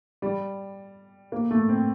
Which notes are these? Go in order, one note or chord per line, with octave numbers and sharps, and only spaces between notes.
G3
A#3
A3
C4